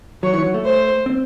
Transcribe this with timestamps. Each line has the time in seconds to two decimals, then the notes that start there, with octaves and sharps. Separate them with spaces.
0.23 F#3 C#5
0.34 E3
0.44 F#3
0.54 A3
0.64 C5
1.06 C4